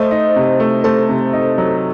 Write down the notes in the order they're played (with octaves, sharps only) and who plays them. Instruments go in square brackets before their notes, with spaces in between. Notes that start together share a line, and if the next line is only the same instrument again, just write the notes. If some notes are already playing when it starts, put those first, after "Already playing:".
Already playing: [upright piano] A3 [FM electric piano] C5 D#5
[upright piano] D#4
C3
A3
[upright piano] A3 [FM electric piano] A4 C5
[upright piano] C3
D#4
F#3